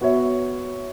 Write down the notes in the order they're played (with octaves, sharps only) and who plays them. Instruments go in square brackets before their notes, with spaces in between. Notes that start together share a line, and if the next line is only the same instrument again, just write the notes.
[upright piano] B3 F#4 C#5 E5